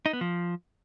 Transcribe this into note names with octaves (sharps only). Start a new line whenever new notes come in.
D#4
B3
F3